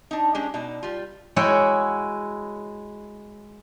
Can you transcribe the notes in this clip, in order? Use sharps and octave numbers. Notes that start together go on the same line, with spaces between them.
D4 D#4
G#3 C#4 D4 G4
B2 D#4 D5
G3 F4
G#3 E4 F#4 C#5 G5